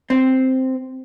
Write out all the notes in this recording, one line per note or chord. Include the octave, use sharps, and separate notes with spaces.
C4